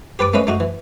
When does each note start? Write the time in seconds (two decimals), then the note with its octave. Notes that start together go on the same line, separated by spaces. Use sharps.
0.19 G4 B4 A5 D6
0.34 A3 A#3 C#4 B4 D#5
0.47 A3 D#4 F#4
0.60 E3